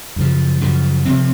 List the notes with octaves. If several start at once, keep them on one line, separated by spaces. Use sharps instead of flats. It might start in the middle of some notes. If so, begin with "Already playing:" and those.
F#2 C#3 F3
F#2 C#3 F3
C3 F3 C4